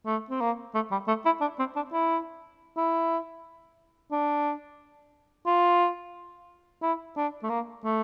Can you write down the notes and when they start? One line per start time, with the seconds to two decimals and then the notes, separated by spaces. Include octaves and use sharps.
0.06 A3
0.30 C4
0.40 A#3
0.75 A3
0.91 G3
1.08 A3
1.25 E4
1.41 D4
1.59 C4
1.76 D4
1.93 E4
2.77 E4
4.12 D4
5.46 F4
6.82 E4
7.17 D4
7.43 A3
7.50 A#3
7.84 A3